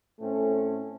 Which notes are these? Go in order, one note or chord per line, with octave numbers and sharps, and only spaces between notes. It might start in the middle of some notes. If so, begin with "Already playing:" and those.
A2 A3 C4 C#4 A4